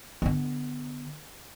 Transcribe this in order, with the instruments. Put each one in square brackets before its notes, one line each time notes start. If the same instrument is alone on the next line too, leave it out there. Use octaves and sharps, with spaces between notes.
[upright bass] D3 B3